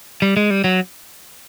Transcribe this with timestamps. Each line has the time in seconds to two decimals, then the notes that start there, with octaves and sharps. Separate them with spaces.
0.22 G3
0.37 G#3
0.50 G3
0.64 F#3